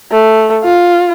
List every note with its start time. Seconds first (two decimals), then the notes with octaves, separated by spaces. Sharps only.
0.11 A3
0.64 F4